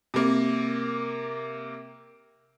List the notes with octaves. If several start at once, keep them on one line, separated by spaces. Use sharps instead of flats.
C3 A#3